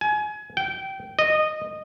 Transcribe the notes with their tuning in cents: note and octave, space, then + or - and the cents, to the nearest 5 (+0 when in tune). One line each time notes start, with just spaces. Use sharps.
G#5 +30
G5 -20
D#5 -15